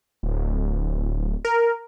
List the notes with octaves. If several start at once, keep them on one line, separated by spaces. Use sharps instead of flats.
D1
A#4